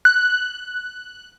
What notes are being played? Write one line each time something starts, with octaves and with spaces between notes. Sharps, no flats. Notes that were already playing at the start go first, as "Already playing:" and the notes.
F#6